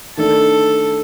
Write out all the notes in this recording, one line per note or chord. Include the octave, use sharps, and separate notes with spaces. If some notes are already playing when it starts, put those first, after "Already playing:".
D#3 A3 D4 A4